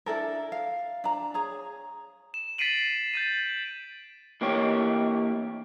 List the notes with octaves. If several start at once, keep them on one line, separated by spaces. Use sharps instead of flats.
D4 E4 A4 A#4
F5
D4 A#5
G#4 C#5 A#5
E7
A6 B6 C7 D7 D#7 F#7
G6 A6 D#7
E3 A#3 C4 G4 C#5